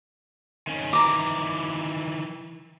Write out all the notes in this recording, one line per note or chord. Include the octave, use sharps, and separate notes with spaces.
D#3 C#4
D#3 E3 A#5 D6